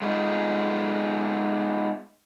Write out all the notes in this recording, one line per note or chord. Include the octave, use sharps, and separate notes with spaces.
G#3 A3 B3 D#4 F4 G#4